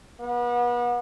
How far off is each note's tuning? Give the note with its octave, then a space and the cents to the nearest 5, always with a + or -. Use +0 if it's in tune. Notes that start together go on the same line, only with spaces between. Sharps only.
B3 -35